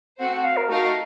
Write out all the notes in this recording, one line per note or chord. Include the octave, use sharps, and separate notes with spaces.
A3 C4 F#4 C5 F#5
F#5
F5
A#4
A3 D#4 F#4 A#4 F5